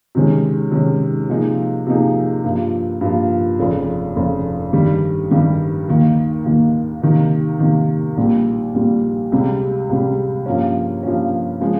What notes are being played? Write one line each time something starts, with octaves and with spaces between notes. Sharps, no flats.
C3 D#3 G#3 C#4
C3 D#3 G#3 C#4
C3 F3 A#3 D#4 G#4
C3 F3 A#3 D#4 G#4
G2 F3 A#3 F4
G2 F3 A#3 F4
F1 F2 C#3
F1 F2 C#3
G2 D#3 G3
G2 D#3 G3
D#2 D#3 A#3
D#2 D#3 A#3
C3 D#3 A#3
C3 D#3 A#3
A#1 A#2 G3
A#1 A#2 G3
C#2 C3 G3
C#2 C3 G3
G2 F3 A#3 C#4
G2 F3 A#3 C#4
C#3 F3 G#3